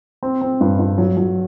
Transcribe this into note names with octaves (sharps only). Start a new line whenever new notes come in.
C4
C4
G2
G2
F#3
F#3